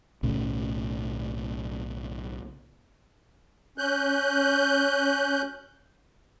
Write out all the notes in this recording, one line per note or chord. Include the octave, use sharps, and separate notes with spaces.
B1 A2 C#3
C#4 F#6 G6